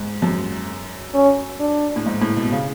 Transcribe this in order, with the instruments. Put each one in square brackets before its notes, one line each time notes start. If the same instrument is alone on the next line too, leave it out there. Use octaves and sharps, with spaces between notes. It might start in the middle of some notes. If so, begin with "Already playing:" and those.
Already playing: [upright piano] G#2
F#2
[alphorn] C#4
D4
[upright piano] A2
G#2
A2
B2
C#3